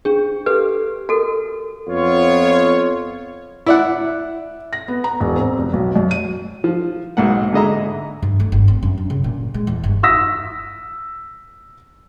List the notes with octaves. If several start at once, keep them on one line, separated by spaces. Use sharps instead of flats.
D4 G#4
G4 A4 B4
F#4 A4 A#4
F2 B3 F4 C#5
E4 D5 F#5
A#6
B3
A#5
E1
C4
F1
B1
F#2
D#7
F3
B1 G#2 A#3 F#5
G#2 D3 G#4 D#5 E5 A#5
G2
A3
G1
C4
F#2
D4
C#3
A#2
G#3
E2
G1
D#6 E6 A#6 B6